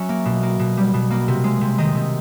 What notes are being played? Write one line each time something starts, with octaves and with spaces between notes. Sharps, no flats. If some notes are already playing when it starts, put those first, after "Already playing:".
Already playing: F#3 C#4 E5
A#3
B2
A#3
B2
G3
B2
A#3
C3
G#3
C3
D#3 D#5
C3